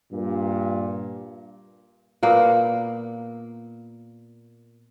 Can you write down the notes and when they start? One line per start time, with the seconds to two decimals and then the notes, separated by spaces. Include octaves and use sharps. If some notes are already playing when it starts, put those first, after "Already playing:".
0.12 G2 A#2
2.23 A#2 A#3 B3